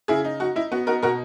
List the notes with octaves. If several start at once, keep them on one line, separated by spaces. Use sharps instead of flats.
C#3 E4 G#4
D#4
D#4 F#4
D#4 E4
B3 F#4
D#4 F#4 A#4
B2 F#4 A#4